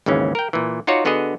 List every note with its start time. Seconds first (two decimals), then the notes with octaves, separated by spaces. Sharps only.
0.06 G#1 D#2 C#3 E3 C#4
0.35 A#4 G5
0.53 A#2 E3
0.87 D#4 F4 F#4 C#5 D5
1.05 D3 B3 F#4 G#4 D#5